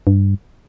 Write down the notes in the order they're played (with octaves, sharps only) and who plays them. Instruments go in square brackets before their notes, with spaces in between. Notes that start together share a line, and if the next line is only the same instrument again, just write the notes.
[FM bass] G2